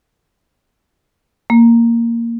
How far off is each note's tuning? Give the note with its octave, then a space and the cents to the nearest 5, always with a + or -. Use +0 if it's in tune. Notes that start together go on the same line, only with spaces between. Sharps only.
A#3 -5